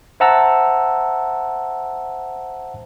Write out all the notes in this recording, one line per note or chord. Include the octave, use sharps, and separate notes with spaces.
C5 E5 F#5 A5 A#5 E6